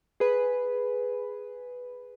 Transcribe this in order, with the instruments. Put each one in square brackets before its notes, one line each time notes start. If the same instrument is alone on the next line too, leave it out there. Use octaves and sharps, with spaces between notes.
[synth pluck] G#4 B4